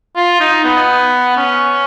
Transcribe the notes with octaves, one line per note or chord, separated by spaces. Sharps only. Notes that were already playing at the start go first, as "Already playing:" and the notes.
F4
D#4
B3
C#4